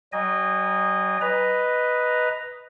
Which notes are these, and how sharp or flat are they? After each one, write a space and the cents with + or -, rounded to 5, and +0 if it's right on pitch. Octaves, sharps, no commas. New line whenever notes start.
F#3 +40 D#5 -15 G#5 -35
B4 +0 D#5 +0 A#5 +0